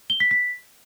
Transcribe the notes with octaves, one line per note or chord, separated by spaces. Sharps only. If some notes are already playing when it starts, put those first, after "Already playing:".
G7
B6
B6